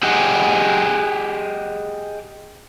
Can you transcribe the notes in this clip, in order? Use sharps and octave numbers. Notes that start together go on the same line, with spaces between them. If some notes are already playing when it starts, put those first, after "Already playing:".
G4 G#4 D#5 F#5 G5